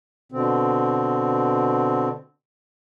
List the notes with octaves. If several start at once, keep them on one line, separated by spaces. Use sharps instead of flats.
B2 D3 C4